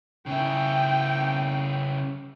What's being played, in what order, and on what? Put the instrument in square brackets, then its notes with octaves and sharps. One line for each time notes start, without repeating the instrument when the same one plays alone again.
[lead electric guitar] C#3 E4 [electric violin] G5